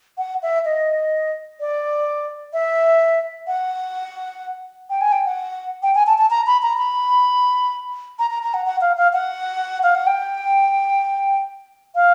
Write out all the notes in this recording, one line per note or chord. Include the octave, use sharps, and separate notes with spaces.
F#5
E5
D#5
D5
E5
F#5
G5
G#5
G5
F#5
G5
G#5
A5
A5
A#5
B5
A#5
B5
A#5
A#5
A#5
F#5
F#5
F5
F5
F#5
F5
F#5
G5
F5